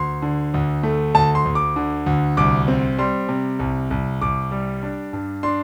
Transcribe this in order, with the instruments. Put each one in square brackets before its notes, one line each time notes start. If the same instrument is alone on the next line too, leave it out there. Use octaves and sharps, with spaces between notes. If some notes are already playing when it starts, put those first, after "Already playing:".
Already playing: [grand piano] D2 C6
D3
D2
A3
D2 A5
C6
D2
D6
D3
D2
C2 D6
C4
G3 C6
C3
C2
C2
C2 D6
G3
D4
G2
D4 C6